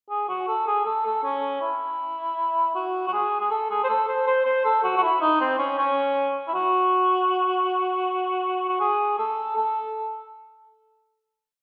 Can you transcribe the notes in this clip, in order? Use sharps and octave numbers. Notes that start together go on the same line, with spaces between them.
G#4
F#4
A4
G#4
A4
A4
C#4
E4
F#4
F#4
G#4
G#4
A4
G#4
C5
A4
C5
C5
C5
A4
F#4
F#4
E4
D#4
C4
C#4
C#4
E4
F#4
F#4
G#4
A4
A4